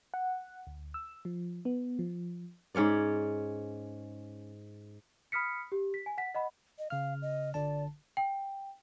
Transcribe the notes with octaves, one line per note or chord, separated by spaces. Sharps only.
F#5
D2
E6
F3
B3
F3
G#2 C#4 C#5 D5
B5 D#6 F6 B6 C#7
G4
B6
G#5
F#5 B6
D#5 F#5 B5
D#5
C#3 F5 F6
D#5
G1 D3 D5 A5
G5